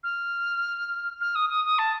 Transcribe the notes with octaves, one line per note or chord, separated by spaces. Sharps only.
F6
F6
D#6
D#6
D#6
A5